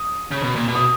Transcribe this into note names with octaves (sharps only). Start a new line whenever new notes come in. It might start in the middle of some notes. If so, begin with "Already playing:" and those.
Already playing: D#6
C#3
B2
A#2
B2
D#6